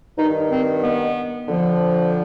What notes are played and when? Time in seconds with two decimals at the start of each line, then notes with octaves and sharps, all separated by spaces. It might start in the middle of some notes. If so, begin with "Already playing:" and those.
0.18 G2 D#3 D#4
0.51 C4
0.83 B3
1.48 F2 D3 F3